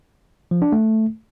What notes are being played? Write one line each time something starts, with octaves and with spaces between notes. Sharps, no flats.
F3
D4
A3